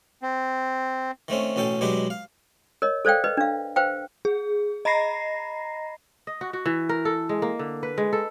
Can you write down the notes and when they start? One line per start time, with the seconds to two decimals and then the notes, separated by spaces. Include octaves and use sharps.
0.22 C4
1.28 D#3 A3 C4 C#4
1.56 A1 B2 C#4 A4 G5
1.81 B2 F#3 G#3 B3 D4 G4
2.10 F5
2.82 A#4 C#5 D#5
3.05 A4 C5 D5 F5 G5
3.24 B4 D#5
3.37 D4 F5
3.76 B4 C5 F5 G5
4.25 G#4
4.85 D#5 A#5 B5 A#6 C7
6.27 D#5
6.41 F#4
6.53 F#4
6.66 E3
6.89 A#4
7.05 A4
7.29 G#3
7.42 A#3
7.59 D3
7.83 B4
7.98 G#3
8.13 A4